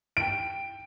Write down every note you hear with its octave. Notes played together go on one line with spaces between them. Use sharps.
G5 D7